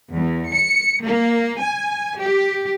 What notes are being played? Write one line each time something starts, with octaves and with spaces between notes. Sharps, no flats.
E2
C#7
A#3
G#5
G4